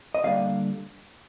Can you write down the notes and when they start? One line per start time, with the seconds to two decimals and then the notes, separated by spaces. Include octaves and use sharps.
0.15 D#5
0.23 D3 G3 A#3 D5 F5